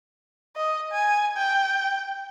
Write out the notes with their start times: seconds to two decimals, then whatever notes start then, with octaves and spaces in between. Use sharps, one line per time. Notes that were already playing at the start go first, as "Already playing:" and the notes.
0.56 D#5
0.92 G#5
1.37 G5